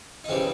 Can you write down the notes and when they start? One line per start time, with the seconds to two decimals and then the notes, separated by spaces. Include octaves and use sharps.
0.24 D#4
0.29 C#3 E3 G3 C4 D4